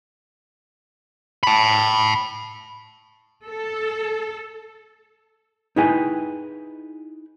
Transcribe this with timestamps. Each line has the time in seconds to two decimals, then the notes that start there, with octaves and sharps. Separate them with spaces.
1.43 A5 B5
3.46 A4
5.76 D#4 E4 G#4 B4 G5 G#5